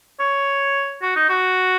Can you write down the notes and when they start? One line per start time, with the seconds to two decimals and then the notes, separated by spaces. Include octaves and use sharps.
0.20 C#5
1.02 F#4
1.16 D#4
1.29 F#4